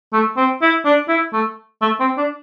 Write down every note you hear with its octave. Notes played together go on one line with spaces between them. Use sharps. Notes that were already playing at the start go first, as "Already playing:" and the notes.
A3
C4
E4
D4
E4
A3
A3
C4
D4